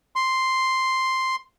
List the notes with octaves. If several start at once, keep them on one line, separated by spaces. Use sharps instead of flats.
C6